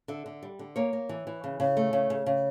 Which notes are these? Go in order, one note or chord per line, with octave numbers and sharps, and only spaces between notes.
D3 E5
D3
G3
D3
A#3 C#5
A#3
E3
E3
C#3
C#3
A3
C#3
C#3
C#3